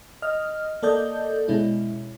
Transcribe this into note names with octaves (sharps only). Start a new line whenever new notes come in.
D#5 F6
A#3 A4 D5 D#5 G6
B2 G#3 C#4 E4